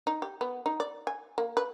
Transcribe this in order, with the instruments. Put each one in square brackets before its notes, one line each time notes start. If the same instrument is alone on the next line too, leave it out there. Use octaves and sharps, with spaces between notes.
[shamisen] D#4
G4
B3
D#4
D5
G#5
A#3
B4